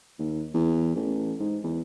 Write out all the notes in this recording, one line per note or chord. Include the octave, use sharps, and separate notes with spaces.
D#2
E2
A1
G#2
E2